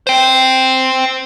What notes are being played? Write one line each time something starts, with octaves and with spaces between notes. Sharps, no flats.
C5 G5